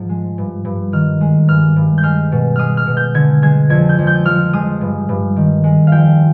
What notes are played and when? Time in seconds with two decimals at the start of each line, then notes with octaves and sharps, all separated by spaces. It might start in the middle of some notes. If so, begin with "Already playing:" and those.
Already playing: G#2 F3
0.09 G#3
0.38 G2
0.65 G2
0.92 D#3 F6
1.21 G#3
1.48 G2 F6
1.76 G2
1.98 G6
2.03 G#3 F6
2.32 B2
2.56 G#3 D#6 F6
2.77 F6
2.86 B2
2.97 G6
3.14 D3 G#6
3.42 G#3 G#6
3.70 F2 G#6
3.89 G6
3.98 F2
4.07 G6
4.25 F3 F6
4.53 G#3 D#6
4.81 G2
5.09 G2
5.36 D#3
5.64 G#3
5.87 F2 F5 G5